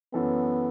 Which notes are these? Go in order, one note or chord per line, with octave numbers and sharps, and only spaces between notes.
F#2 E3 B3 C#4 A4